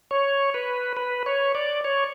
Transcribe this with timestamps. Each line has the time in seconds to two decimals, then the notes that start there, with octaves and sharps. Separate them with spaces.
0.11 C#5
0.54 B4
0.97 B4
1.26 C#5
1.55 D5
1.84 C#5